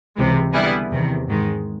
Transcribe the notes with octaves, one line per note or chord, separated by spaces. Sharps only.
C#2 C3 E3 G#3
D3 G3 B3 E4 G#4
E2 C3 D#3
G#2 D#3 G#3